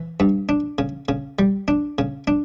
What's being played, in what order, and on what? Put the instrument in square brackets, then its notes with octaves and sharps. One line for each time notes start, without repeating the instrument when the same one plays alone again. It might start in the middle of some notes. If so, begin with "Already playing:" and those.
Already playing: [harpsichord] E3
G2
D4
C#3
C#3
G3
D4
C#3
D4